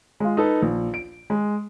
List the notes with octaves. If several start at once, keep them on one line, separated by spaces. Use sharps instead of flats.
G#3 F4
D#4 A4 B4
A#1
D7
G#3